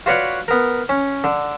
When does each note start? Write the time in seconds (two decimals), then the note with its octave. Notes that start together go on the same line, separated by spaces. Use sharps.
0.06 F4 F#4 B4 C#5 D5 F#5
0.48 B3 A#4
0.89 C#4
1.24 D3